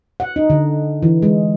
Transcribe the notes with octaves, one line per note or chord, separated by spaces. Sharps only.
F#5
D#4
D3
E3
G#3